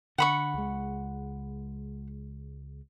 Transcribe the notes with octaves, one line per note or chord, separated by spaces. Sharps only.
D3 F#5 B5 C#6
C#2 G#3